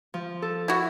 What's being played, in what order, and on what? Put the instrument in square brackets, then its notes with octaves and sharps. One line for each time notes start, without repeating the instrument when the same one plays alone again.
[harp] F3
A4
[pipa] E4 F#4